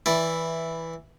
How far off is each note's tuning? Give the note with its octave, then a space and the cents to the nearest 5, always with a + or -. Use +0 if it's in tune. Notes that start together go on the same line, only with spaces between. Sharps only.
E3 -5 E4 +0 D5 +0